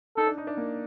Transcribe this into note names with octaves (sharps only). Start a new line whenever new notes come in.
D#4 A4
D4
D#4
D4
A#3